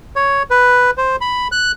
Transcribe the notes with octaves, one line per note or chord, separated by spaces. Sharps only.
C#5
B4
C5
B5
F#6